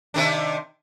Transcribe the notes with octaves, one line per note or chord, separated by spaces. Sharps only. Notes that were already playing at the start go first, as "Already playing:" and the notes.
C3 D#3 D4